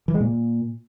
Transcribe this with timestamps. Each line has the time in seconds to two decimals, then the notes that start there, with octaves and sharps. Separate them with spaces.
0.08 E3
0.14 G#3
0.20 A#2